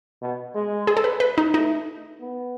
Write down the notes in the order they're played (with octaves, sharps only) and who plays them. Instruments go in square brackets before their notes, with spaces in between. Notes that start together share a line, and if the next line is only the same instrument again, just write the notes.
[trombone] B2
G#3
[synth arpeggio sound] G#4
A4
B4
B4
D#4
[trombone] A3 [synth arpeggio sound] D#4
[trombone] B3